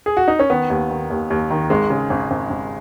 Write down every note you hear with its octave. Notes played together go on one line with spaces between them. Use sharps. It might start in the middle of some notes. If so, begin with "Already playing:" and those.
G#4
F#4
D#4
C#4
D#3 B3
D#2
D#3
D#2
D#2
D#3
G#1 G#3
C#3
G#1
G#1
G#1